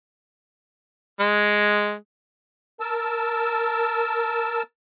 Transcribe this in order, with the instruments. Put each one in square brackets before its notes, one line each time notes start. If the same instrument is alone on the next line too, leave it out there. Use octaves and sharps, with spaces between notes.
[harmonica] G#3
[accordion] A#4 A5 E6